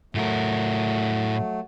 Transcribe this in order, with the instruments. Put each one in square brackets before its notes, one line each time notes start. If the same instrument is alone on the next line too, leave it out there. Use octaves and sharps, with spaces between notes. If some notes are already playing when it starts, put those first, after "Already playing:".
[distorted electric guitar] A2 A#4 [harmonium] F#3 A3